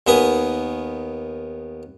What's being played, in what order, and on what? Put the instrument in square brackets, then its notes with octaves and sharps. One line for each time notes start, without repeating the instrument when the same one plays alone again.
[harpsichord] D#2 D#3 B3 B4 G#5 D#6